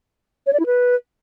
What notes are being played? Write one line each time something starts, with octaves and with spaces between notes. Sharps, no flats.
C#5
D5
E4
B4